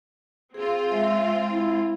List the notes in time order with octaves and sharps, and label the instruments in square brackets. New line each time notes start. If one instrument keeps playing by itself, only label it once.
[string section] C4 F4 [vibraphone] G#4
[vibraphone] G#3 [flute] E5
[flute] E4